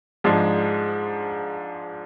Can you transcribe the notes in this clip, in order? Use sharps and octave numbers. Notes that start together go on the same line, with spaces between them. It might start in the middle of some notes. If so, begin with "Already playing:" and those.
G#2 F3 G#3 D4